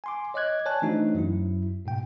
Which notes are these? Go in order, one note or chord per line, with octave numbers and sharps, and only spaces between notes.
G#5 C6 D6
C#5 D#5 D6 F#6 G#6
C#5 D5 G#5 A5 F#6
E3 A3 D4 D#4 F#4 C5
F#2 F#3 E4
G#2 B2 G5